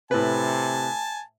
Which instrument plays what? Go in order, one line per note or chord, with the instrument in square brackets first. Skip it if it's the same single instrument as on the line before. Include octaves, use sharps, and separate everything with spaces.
[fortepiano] A2 B4 [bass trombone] C3 [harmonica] G#5 A5